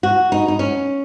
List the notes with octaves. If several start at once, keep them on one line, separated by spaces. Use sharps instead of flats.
F#4
D#4
D#4
C#4